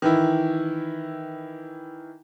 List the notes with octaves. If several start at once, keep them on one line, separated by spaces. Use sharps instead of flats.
D#3 E3 E4